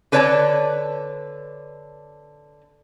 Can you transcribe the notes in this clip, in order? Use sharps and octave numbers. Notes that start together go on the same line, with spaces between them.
D3 B4 C#5 D5 A5